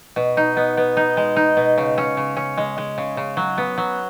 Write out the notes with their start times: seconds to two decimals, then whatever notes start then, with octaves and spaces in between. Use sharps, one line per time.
0.16 B2
0.37 D#4
0.57 B3
0.77 B3
0.97 D#4
1.17 G#3
1.36 D#4
1.57 B2
1.78 C#3
1.98 C#4
2.17 C#3
2.37 C#4
2.58 G#3
2.78 G#3
2.98 C#3
3.17 C#3
3.37 F#3
3.58 B3
3.78 F#3